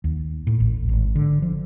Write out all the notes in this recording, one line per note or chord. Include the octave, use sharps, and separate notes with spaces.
D#2
A2
A1
G#1
D3
F3